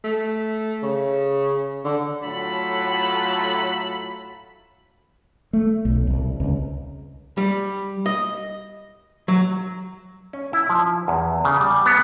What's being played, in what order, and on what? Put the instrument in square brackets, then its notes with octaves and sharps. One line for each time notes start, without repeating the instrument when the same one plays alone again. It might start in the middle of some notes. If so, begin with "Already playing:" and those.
[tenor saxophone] A3
C#3
D3
[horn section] A2 F#3 A3 F4 A4 B5
[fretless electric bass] A3
B1
C2
C#2
[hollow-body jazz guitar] G3
D#5
F#3
[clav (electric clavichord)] C#4
E4
F3
E2
C#3
G3
B3